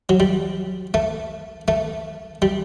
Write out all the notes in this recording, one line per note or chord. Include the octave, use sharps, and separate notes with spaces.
F#3
G3
A3
A3
G3